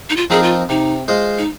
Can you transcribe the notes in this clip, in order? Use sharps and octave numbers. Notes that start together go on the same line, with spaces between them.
D#4
F4
F3 C4 D#4 G#4 A#4
F4
C3 D#4
G#3 F4 C5 D#5
D#4